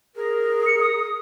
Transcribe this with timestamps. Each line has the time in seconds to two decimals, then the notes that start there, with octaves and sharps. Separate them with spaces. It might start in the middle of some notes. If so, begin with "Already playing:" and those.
0.16 G#4 A#4
0.66 C#7
0.81 D#6